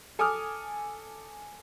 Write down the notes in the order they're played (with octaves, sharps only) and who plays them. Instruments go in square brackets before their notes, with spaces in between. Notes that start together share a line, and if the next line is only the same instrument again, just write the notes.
[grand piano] A4 G#5 D6 D#6 F6